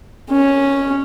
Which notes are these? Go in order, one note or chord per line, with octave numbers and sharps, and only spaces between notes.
C#4